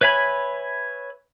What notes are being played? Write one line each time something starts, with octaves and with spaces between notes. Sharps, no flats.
B4 C#5 E5 G#5 B5